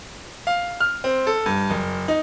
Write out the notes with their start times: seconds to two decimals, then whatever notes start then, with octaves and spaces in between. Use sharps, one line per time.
0.47 F5
0.80 F6
1.04 C4
1.27 A4
1.46 G2
1.70 F#1
2.08 D#4